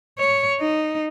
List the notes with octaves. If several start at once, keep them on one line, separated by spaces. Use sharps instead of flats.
C#5
D#4